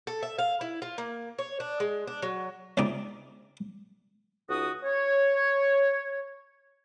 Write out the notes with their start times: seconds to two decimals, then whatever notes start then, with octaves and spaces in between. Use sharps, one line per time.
0.07 A4
0.23 E5
0.38 F5
0.61 E4
0.82 F4
0.98 A#3
1.38 C#5
1.60 D4
1.80 G#3
2.07 D4
2.22 F#3
2.77 C#2 C3 D#4 D5 D6
4.49 C#2 D#4 F#4 D#6
4.84 C#5